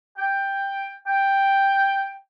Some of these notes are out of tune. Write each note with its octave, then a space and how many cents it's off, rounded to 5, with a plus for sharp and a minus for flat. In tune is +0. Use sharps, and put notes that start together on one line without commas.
G5 +5
G5 +5